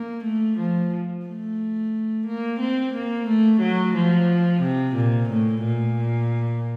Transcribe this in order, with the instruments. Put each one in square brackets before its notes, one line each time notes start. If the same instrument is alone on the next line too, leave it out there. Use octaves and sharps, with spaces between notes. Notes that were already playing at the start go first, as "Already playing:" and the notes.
Already playing: [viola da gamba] A#3
A3
F3
A3
A#3
C4
A#3
A3
F#3
F3
C3
A#2
A2
A#2